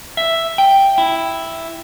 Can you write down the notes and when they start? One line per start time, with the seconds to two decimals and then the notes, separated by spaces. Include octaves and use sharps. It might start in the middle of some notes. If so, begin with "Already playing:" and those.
0.17 E5
0.58 G5
0.98 E4